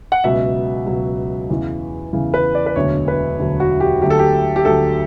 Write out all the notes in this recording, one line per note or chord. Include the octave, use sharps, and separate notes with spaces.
F#5
C#2 B2 F#3 E5
C#2 B2 F#3
E2 C#3 E3
E2 C#3 E3
B4
D5
B4
E1 D2 D3 F#3 C#5
B4
E1 D2 D3 F#3
F#4
G4
D2 D3 F#3 G4
A4
G4
G4
D2 D3 F#3 A4